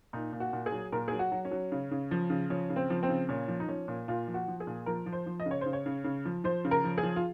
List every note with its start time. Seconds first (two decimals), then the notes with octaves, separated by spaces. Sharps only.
0.13 A#2 D#4
0.33 A#2
0.40 F#4
0.53 A#2
0.66 G#4
0.72 F#3
0.92 A#2 A#4
1.08 F#3 G#4
1.19 F#4
1.32 F#3
1.45 C#4
1.51 F#3
1.72 C#3
1.91 C#3
2.11 F3
2.30 C#3
2.50 F3 C#4
2.70 C#3
2.76 C4
2.90 F3
3.03 C4
3.09 C#3
3.29 A#2 C#4
3.48 F3
3.60 D#4
3.68 F3 C#4
3.88 A#2
4.08 A#2 F4
4.27 F3
4.34 F#4
4.48 F3
4.60 G#4
4.67 A#2
4.86 F3 A#4
5.06 F3
5.12 C5
5.26 F3
5.40 D#5
5.46 C#3
5.51 C#5
5.61 C#3 C5
5.73 C#5
5.86 C#3
6.04 C#3
6.25 F3
6.44 F3 C5
6.65 C#3
6.71 A#4
6.84 F3
6.98 G#4
7.03 F3
7.16 F4